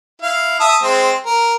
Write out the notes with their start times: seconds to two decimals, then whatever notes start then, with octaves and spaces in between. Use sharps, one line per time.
0.22 E4 F5
0.60 E5 A5 D#6
0.83 G#3 C4
1.26 A#4